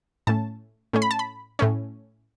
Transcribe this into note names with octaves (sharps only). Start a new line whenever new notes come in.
A2 A3 C#4 A5
A2 A3 C#4
B5
A5
B5
A2 A3 C#4